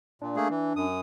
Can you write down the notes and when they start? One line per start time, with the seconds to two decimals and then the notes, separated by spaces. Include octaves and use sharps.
0.22 A#2 D4
0.36 A3 A#3 G#4
0.50 E3
0.76 F#2 D#6